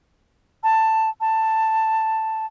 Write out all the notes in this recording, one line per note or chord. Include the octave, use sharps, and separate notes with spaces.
A5
A5